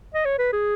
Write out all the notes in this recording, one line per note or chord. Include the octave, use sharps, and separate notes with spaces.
D#5
C#5
B4
G#4